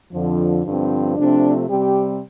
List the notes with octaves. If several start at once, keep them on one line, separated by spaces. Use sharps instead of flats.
F2 D3 F3
G2 D3 F3 C4
C3 F3 A3 C4 D4
C3 G3 C4 G4